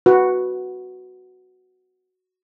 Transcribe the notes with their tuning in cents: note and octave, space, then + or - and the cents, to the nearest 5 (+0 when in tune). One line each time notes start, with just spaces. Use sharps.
F#4 +0 B4 +0